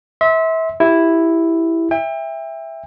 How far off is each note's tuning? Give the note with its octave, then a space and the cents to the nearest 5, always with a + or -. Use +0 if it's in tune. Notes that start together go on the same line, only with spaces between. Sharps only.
E5 -30 C6 +0
E4 +0 G4 +0
E5 +0 G5 +35